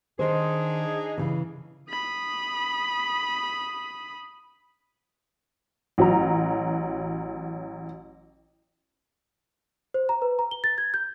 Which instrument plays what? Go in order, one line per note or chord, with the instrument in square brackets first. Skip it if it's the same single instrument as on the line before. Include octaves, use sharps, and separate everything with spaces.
[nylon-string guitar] D#3 C5 [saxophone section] D4 D#4 G#4
[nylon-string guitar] C#3 E3
[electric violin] B5 D#6
[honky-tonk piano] A1 F#3 A#5
[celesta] C5
A#5
B4
A#5
G7
A6
G#6
G6